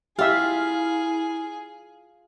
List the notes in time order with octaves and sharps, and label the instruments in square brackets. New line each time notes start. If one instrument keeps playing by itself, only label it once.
[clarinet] E4 [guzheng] F4 [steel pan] G4 E5 [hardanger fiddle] G#4